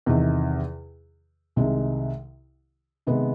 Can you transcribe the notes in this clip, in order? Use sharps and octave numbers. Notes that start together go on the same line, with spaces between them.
E2 C3 D#3
C2 C3 D#3 G#3
C3 D#3 G#3 B3